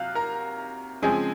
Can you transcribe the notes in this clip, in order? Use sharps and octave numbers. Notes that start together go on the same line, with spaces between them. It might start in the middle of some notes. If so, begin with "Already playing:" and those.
Already playing: C3 F#3 F5 F6 F#6
A#4 A#5
C#3 F3 G#3 C4 G#4 G#5